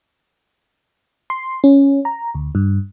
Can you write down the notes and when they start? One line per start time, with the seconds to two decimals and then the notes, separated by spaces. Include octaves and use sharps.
1.30 C6
1.64 C#4
2.05 A#5
2.35 D2
2.55 G2